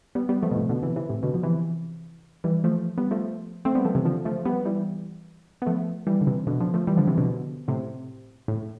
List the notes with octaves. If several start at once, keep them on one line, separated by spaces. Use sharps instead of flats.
G3 B3
G3 B3
F3 A3
B2
A2 C3
B2 D3
C3 E3
C3 E3
A2 C3
B2 D3
F3
C3 E3
E3 G3
F3 A3
G3 B3
F3 A3
A3 C4
G3 B3
F3 A3
C3 E3
D3 F3
F3 A3
G3 B3
E3 G3
B3
F3 A3
E3 G3
D3
C3 E3
B2 D3
D3 F3
F3 A3
E3 G3
D3 F3
C3 E3
B2 D3
A2 C3
A2